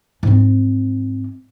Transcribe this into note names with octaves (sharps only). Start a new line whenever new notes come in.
G#2 C4